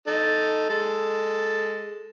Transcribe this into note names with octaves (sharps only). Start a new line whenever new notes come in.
D#4 A4
G#3 A4